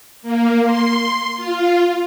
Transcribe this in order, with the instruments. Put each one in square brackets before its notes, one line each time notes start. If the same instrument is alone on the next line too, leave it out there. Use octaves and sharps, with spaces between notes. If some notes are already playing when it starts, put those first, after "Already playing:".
[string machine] A#3
C6
F4